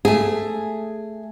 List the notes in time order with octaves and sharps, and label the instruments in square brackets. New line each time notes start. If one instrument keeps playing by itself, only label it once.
[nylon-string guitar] A3 G#4